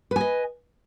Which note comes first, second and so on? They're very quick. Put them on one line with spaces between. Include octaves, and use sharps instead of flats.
B4 G#5 D#5